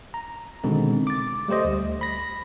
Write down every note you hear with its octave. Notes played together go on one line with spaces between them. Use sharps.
A#5
B2 D3 D#3 G#3 C4
D6 A6
G3 A3 G4 C5 D#5
D2
B5 A#6